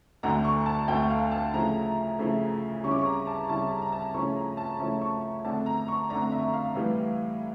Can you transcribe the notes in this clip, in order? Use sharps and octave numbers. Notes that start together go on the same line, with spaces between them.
D2 D3 A3 A#5
C#6
A5
D2 D3 A3 G5
F5
A5
C#3 F3 A3 E4 A#5
C#3 F3 A3 E4
C#3 G3 C#4 E4 C#6
D6
C#6
A#5
A5
C#3 G3 C#4 E4 A5
A#5
A#5
A5
C#3 F3 A3 C#4 E4 C#6
A#5
A5
C#3 F3 A3 C#4 E4
C#6
F2 D3 A3 D4 A5
A#5
C#6
F2 D3 A3 D4 A#5
E5
F5
A2 E3 G3